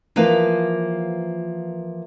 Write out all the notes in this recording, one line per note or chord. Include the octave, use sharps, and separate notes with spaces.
E3 F3 A#3 B4 F5